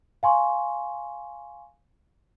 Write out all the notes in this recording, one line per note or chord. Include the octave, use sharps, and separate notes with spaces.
F5 G#5 C6 C#6